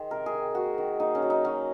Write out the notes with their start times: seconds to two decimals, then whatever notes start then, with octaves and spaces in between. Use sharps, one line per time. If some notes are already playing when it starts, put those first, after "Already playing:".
Already playing: D#3 G#4 C5
0.10 C3 A#4
0.26 G#4
0.34 D#3
0.55 A#3 F#4
0.78 D#3
1.00 A#3 D#4
1.15 C#4
1.22 F#3
1.30 D#4
1.45 F#3 C#4